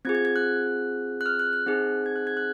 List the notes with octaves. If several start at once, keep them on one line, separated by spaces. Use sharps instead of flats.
C4 F4 G#4 G#6
G#6
G#6
F#6
F#6
F6
F#6
F#6
C4 D#4 G#4
G#6
F#6
G#6
F#6